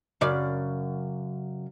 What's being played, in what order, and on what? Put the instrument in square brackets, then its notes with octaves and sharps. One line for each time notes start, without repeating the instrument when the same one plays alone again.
[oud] F#2 C#3 D5